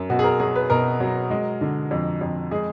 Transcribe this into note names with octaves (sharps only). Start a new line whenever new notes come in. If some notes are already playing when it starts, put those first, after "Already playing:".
Already playing: F#2
B2 F#4
G#4
A#4
F#3 G#4
B4
B2 A#4
F#3
G#3
D3
F2
F2
G#3 G#4